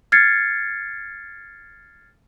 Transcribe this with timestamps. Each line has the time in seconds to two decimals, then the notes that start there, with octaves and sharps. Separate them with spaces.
0.12 F6 G#6 A6 C7 C#7